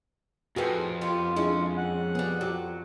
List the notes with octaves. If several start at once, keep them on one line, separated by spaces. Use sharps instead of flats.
F2 A2 F#4 G#4 B4 G5
B3 F4 G4
G#3 C#4 D4 E4
F#5 F#6
G3 B3 G#4
F#3 F#4 G4